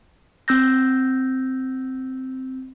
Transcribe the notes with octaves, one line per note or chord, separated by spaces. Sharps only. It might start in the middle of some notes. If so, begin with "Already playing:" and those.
C4 E6 G6 A#6